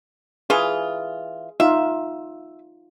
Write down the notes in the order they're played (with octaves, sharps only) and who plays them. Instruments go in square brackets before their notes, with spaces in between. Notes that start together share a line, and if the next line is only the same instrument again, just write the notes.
[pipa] E3 F4 [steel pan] G#4
[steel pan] D#4 F4 [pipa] E5